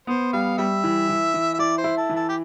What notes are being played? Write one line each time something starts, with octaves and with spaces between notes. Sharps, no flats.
B3 C5
G3 F5
G3 E5
E3
E3
E3
E5
E4 D5
C5
E4
A4
E3
A4
G4